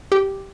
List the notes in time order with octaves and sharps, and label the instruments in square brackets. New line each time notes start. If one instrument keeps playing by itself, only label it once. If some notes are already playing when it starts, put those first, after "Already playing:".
[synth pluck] G4